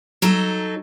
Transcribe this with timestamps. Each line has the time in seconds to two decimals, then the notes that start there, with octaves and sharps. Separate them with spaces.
0.22 F#3 D#4 A4